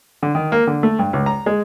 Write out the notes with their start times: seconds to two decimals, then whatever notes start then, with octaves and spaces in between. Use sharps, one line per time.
0.23 D3
0.35 D#3
0.52 A#3
0.67 D3
0.83 A3
0.99 G2
1.13 C#2
1.26 A#5
1.46 G#3